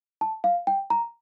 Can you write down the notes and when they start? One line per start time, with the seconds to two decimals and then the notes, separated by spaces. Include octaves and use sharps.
0.21 A5
0.44 F5
0.67 G5
0.90 A#5